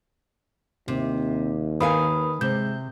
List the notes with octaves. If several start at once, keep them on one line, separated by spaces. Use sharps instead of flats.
D#2 C3
D#3 B4 F5 G#5 B5 D#6
C3 G#3 G6